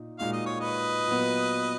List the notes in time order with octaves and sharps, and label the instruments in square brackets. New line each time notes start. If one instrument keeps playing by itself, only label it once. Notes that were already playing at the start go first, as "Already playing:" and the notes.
Already playing: [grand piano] A#2 D#4
[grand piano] A#2 G#3 D#4 F#4 [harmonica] F5
[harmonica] D#5
C#5
B4 D#5
[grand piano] A#2 F#3 B3